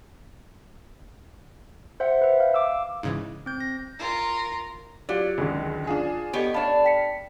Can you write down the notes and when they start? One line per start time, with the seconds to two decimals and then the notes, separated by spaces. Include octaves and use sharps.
2.00 C5 E5 F#5
2.21 B4 E5
2.40 F5
2.54 F5 D6 E6
3.03 G#2 C#3 E3
3.46 C4 G6
3.60 A#6
3.99 F4 A#4
5.09 F#3 F4 G4 D5
5.38 C#2 D3 D#3
5.87 D4 F4 G#4
6.33 B3 G4 A4 C#5 D#5 D7
6.54 D4 A4 C#5 F5 B5
6.85 G5 B6 C#7